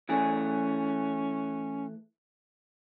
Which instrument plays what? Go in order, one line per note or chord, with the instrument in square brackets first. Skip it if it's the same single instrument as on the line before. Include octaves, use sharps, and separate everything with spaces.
[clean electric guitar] E3 A3 G#4 [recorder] C#4